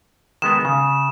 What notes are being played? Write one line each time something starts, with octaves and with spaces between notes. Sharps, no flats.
D#3 G#3 B3 E7
C#3